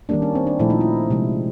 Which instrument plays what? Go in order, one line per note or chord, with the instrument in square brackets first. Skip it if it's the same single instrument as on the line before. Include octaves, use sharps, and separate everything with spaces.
[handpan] D#3 G3 A#3 D4
C#4
C4
D4
A#2 F3 A3 E4
D#4
E4
C3 F3 G#3